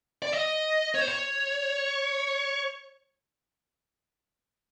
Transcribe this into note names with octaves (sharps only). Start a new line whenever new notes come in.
D5
D#5
C#5
C5
C#5